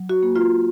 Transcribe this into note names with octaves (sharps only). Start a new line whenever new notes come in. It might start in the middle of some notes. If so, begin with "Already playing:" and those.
Already playing: F#3
F#4
A#3
F4